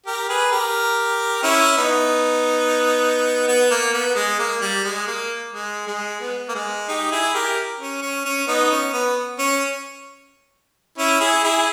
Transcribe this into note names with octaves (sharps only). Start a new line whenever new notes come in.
G4 A#4
G#4 B4
G4 A#4
C#4 E4
B3 D#4
B3
A#3
B3
G#3
A#3
G3
G#3
A#3
G#3
G#3
B3
A#3
G#3
D#4 G4
E4 G#4
G4 A#4
C#4
C#4
C#4
B3 D#4
C#4
B3
C#4
C#4 E4
E4 G#4
E4 G#4